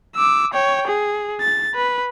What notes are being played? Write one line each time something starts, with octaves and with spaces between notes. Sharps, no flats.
D6 E6
C#5 G5
G#4
A6
B4